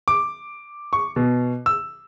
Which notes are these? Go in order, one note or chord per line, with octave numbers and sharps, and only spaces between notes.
D6
C#6
B2
E6